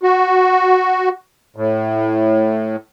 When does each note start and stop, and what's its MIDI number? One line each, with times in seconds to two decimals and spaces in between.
0.03 1.09 66
1.56 2.76 45